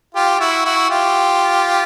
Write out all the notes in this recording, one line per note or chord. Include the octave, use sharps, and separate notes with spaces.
F4 G4
E4 F#4
E4 F#4
F4 G4